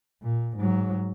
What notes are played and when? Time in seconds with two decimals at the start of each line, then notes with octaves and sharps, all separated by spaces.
0.22 A#2
0.57 G#2 F#3